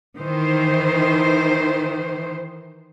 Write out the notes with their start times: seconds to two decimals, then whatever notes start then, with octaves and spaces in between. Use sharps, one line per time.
0.18 D#3 E3 C5